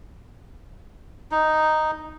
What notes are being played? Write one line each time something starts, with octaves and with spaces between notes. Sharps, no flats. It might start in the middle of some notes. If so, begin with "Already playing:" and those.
D#4